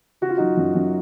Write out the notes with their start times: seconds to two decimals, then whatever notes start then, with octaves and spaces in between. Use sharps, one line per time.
0.21 C#3 F#4
0.29 F4
0.37 F#3 D#4 F#4
0.57 F#2
0.75 F#2